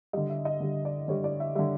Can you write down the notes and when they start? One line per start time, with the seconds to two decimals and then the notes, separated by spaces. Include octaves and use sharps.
0.13 D3 G3 D#5
0.30 E5
0.45 D#5
0.60 D3 G3
0.85 D5
1.08 D3 G3 C#5
1.24 D5
1.40 E5
1.55 D3 G3 E5